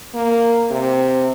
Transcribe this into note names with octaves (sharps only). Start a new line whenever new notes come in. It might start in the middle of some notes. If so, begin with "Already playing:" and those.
A#3
C3